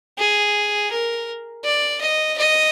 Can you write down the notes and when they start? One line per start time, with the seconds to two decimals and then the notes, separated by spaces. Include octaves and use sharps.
0.18 G#4
0.91 A#4
1.64 D5
2.01 D#5
2.38 D#5